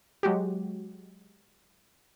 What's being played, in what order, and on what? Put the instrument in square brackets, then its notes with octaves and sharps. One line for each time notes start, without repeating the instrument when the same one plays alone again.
[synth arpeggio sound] F#3 G#3 F#4 G4